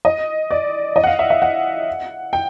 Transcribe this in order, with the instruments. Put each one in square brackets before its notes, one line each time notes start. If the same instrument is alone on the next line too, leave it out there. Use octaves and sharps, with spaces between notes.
[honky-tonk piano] D#5
D5
D#5
F#5
F5
E5
E5
F#5
G5